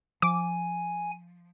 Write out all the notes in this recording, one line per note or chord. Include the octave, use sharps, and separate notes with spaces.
F3 G#5 D6